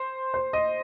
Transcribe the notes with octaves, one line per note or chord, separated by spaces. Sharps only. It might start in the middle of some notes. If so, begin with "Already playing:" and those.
Already playing: C5
C5
D#5